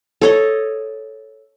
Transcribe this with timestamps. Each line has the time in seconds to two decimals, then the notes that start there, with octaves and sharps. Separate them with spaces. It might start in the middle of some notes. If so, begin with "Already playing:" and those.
0.21 A4 C#5 D#5